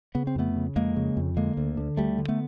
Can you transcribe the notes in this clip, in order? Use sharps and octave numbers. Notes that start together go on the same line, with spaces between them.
C#3 B3
C4
F2 A3 B3
C#3
F2 G#3 A#3
C#3
F2
D3 G#3 A#3
D2
D3
D2 G3 A3
D3
A3 B3